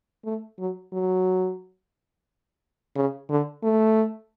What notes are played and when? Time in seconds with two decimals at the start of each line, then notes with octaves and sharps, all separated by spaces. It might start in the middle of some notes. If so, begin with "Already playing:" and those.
0.25 A3
0.58 F#3
0.93 F#3
2.96 C#3
3.30 D3
3.63 A3